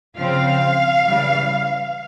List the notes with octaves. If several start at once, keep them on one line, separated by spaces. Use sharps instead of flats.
C#3 F3 C4 F5
C#3 E3 G3